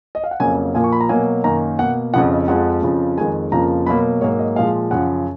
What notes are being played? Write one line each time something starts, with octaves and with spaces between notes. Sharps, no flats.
D#5
F5
F#5
F2 C#3 F#3 A#3 G#5
A#2 F3 A#3 G#5
C#6
B5
A#5
B2 F#3 A#3 G#5
F#2 D#3 A#3 A#5
B2 A#3 F#5
F2 C#3 F3 F#5
D#5
F2 F3 G#3 F#5
F2 C#3 F3
F2 D#3 G#3 G#5
F2 C#3 F3 A#3 A#5
B2 F#3 A#3 B5
G#2 F#3 A#3 C#5
D#5
A#2 F3 G#3 F5
F#2 C#3 F3 F#5